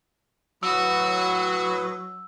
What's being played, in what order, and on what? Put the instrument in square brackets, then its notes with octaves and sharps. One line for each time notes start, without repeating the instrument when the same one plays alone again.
[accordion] A2 B4 D#6 [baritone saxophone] F#3 [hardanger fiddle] F#4 [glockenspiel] E6